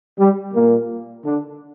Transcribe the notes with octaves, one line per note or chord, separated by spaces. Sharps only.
G3
A#2 A#3
D3 D4